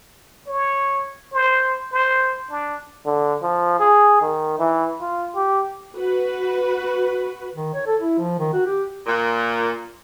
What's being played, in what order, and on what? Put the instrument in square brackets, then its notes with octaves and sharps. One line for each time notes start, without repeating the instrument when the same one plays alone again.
[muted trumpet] C#5
C5
C5
D4
[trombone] D3
F3
G#4
D#3
E3
F4
G4
[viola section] F#4 B4
[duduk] D#3
C#5
A4
E4
F3
D#3
F#4
G4
[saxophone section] A#2